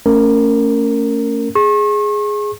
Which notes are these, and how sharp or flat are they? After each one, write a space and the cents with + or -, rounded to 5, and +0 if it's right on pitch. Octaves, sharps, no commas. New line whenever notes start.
A3 +30 C#4 +5 A#4 -15
G#4 +0 C#6 -40